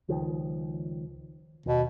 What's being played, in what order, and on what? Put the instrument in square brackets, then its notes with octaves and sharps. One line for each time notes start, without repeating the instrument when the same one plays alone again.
[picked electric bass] C#2 D#3 F3
[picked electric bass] D#2 [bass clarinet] B2